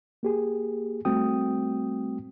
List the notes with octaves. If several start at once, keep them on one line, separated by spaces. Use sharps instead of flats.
A#3 G4 G#4
G3 A3 C4 F#4 G5 D#6